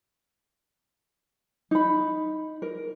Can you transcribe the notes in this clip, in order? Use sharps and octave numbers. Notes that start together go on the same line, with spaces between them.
D#4 B5
A#4